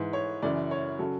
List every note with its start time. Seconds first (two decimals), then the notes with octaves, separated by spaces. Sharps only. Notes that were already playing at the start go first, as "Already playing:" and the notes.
Already playing: G#2 E3 B4
0.13 C#5
0.42 F#2 C#3 E3 D5
0.71 C#5
0.99 C#3 F#3 A4